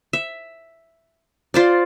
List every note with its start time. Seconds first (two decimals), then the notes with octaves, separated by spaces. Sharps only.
0.13 E5
1.54 F4 C5 D5